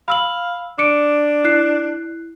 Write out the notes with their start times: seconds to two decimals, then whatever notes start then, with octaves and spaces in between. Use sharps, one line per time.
0.08 F5 B5 E6 F#7
0.78 D4 D6 C#7 D7
1.44 E4 F#6 C7